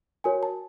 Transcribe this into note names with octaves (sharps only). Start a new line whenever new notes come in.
F#4 A#4 C#5 G#5
A5